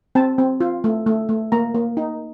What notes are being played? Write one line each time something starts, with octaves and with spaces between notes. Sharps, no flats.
C4 A5
C4
F4
A3
A3
A3
A#3 A#5
A#3
D#4